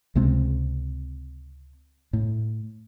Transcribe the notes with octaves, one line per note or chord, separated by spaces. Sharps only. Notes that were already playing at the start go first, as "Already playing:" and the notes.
C#2 C3 G#3 C4
A2